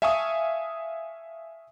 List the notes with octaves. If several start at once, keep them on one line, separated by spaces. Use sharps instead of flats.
E5 F5 G#5 A5 C#6 D#6